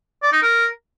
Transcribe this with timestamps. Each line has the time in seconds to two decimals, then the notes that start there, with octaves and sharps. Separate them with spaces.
0.23 D5
0.32 D#4
0.42 A#4